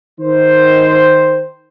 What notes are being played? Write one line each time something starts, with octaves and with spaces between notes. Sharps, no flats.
D#3 C5